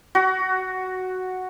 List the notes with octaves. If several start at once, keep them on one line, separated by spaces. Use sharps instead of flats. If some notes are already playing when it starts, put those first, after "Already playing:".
F#4